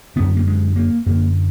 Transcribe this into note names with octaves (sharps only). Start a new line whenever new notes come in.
F#2 D3 B3
A#3
G#3
A#3
F#2 D3 A#3